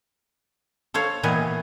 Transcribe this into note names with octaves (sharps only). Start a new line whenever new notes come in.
A4 C5 C#5 F5
A#2 D#3 E3 B3 B4 G#5